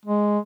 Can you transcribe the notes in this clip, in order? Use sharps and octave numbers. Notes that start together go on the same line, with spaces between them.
G#3